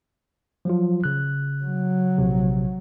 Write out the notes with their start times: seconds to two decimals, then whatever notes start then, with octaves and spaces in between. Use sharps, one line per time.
0.65 F3 F#3 F4
1.04 C#3 F#6
1.63 F#3
2.18 A#1 C3